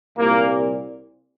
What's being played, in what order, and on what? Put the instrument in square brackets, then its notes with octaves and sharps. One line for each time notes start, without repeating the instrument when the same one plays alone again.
[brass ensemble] C2 A#2 A#3